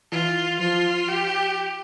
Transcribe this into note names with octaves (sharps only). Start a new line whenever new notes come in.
E3 F4
F3 F4
G4